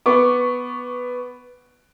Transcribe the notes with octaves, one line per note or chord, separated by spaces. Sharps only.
B3 C#6 D6